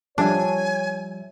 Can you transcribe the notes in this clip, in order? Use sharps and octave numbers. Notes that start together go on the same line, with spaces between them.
F3 G3 D4 C#5 E5 G#5